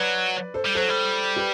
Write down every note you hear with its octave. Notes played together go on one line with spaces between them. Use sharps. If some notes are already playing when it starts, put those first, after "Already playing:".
Already playing: F#3 B4 D5
A4 C5
G3
F#3 A4 C5
G3
G4 B4